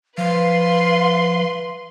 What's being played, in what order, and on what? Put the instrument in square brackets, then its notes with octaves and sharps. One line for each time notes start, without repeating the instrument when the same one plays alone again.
[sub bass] F3 [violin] B4 C6 [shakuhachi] F5